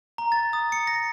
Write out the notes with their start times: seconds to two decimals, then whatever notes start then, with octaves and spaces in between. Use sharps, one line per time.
0.18 A#5
0.32 A6
0.53 D#6
0.72 C#7
0.87 A#6